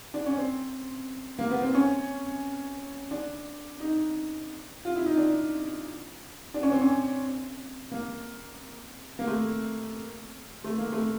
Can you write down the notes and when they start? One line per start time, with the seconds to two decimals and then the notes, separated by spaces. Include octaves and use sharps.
0.14 D4
0.26 C#4
0.37 C4
1.39 A#3
1.50 B3
1.62 C4
1.75 C#4
3.11 D4
3.80 D#4
4.85 F4
4.96 E4
5.06 D#4
5.18 D4
6.54 D4
6.63 C#4
6.72 C4
6.81 C#4
7.91 A#3
9.19 A#3
9.27 A3
10.64 A3
10.78 A#3
10.92 A3